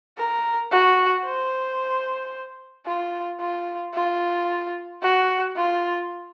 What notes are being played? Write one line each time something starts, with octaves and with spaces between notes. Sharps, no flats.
A#4
F#4
C5
F4
F4
F4
F#4
F4